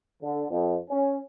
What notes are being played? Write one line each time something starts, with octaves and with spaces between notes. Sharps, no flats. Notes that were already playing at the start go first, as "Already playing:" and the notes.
D3
F2
C#4